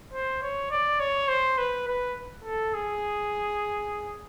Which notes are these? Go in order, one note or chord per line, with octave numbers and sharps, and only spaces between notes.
C5
C#5
D5
C#5
C5
B4
B4
A4
G#4